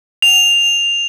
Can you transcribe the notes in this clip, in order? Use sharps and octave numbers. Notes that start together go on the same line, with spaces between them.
F7